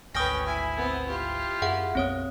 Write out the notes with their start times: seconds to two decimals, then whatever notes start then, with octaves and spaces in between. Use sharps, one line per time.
0.15 G#1 D2 C#4 B4 G5 D#6 F6 A#6
0.47 E4 G#5
0.77 B3 C4
1.08 E4 F4 G4
1.62 F#2 G#4 E5 F#5
1.95 B1 F#2 B3 C4 C#5 D#6